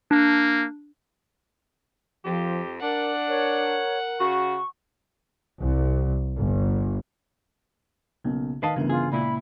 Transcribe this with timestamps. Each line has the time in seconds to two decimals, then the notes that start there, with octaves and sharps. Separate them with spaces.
0.11 A#3 D4
2.25 F2 F3 G4
2.81 D4 A#4 F#5
3.28 A#4 C#5
4.19 C#3 F#4 C#6
5.61 C2
6.37 G1
8.24 B1 C#3 A#3 C#4
8.63 D#3 B4 D#5 F5 A5 C7
8.76 G1 D2 C#3 E3 B3 A#4
8.90 F4 G#4
9.12 C#2 A#2 E4 D5 B5